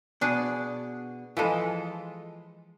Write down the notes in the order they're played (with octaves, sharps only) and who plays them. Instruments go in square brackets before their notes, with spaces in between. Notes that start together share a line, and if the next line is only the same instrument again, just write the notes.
[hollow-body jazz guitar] B2 [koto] D4 G#4
[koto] E3 F3 G#3 [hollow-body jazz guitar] F4 A4